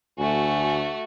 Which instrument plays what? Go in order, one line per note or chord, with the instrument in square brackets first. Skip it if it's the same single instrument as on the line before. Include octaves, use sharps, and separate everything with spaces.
[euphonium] D2 [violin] A3 F#4 [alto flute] G#5